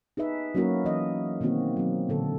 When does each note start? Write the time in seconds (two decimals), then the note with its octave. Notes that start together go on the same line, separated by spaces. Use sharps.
0.17 D#4 G#4 B4 E5
0.55 F#3 A#3 C#4 E4 F#4 A#4
0.85 E3 D#5
1.41 B2 D#3 A#3 C4 F#4
1.77 F#3 C4
2.09 A#2 D3 A4